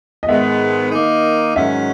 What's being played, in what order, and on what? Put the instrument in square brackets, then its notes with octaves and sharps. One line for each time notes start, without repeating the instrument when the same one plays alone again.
[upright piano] D#5
[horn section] G#2 D#3 G#3 B3 [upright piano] E5
[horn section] D#3 A#3 D#4
[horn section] G#2 D#3 F#3 C#4 [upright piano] E5